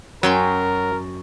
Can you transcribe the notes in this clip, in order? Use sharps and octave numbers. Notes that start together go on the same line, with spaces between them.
F#2 F#3 A#4 G5 C6